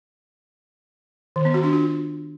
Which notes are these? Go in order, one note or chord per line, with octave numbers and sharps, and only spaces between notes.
D#3
B3
F#4
D4
F4